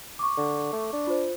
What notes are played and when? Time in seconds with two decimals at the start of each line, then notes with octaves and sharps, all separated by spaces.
0.19 C#6 D6
0.37 D3
0.72 A3
0.93 D4
1.07 F4 C5